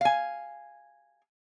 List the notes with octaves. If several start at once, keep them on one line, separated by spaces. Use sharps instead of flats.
F5 G#5